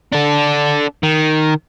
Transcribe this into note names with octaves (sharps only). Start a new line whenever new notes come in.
D4 A4
D#3